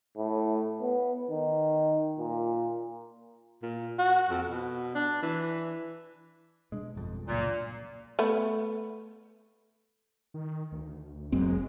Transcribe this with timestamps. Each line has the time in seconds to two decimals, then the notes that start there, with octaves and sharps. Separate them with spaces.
0.17 A2
0.81 B3
1.31 D#3
2.19 A#2
3.63 A#2
3.99 F#4
4.30 F2
4.47 B2
4.95 D4
5.23 E3
6.72 B2 G3 G#3 D4
6.95 G1 F2
7.27 C#2 F#2 A#2 A#3
8.19 A3 B3
10.34 D#3
10.72 D2
11.32 F#1 F#2 G#3 C4